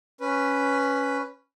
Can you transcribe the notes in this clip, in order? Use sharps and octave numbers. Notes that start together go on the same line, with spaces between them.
C#4 B4